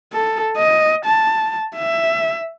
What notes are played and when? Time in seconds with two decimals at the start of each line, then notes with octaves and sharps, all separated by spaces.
0.12 A4
0.57 D#5
1.05 A5
1.76 E5